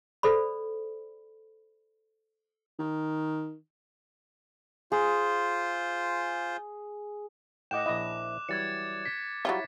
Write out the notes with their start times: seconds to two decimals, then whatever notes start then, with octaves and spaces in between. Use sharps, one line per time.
0.23 A4 C5 D5 B5
2.79 D#3
4.92 F4 G#4 C5
7.71 A2 D#5 F#5 G5 D6 F#6 E7
7.86 A#1 E4 D#5
8.49 E3 F#3 G3 G#6 A6 C#7
9.05 B6
9.45 F#3 G3 E4 F4 C#5